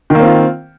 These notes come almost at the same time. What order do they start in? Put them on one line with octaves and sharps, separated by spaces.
D#3 A#3 C4 F4